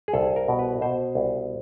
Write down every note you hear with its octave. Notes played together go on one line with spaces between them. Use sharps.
G#4
C2 A4
A#4
B2
B4
B2 C5
C2